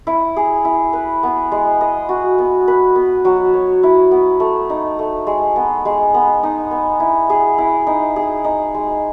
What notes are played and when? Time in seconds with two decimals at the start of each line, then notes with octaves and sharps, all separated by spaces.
0.07 E4
0.36 G#4
0.65 E4
0.93 B4
1.23 B3
1.52 G#3
1.81 D#5
2.09 F#4
2.38 B3
2.68 B4
2.96 B3
3.25 F#3
3.54 C#5
3.83 E4
4.11 B3
4.40 A3
4.70 D#4
4.99 A3
5.27 G#3
5.56 B3
5.85 G#3
6.14 B3
6.43 D#4
6.71 B3
7.00 E4
7.30 G#4
7.58 E4
7.87 D#4
8.16 G#4
8.44 D#4
8.74 G#3